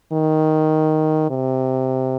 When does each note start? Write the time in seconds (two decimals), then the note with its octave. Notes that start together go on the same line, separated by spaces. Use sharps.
0.12 D#3
1.30 C3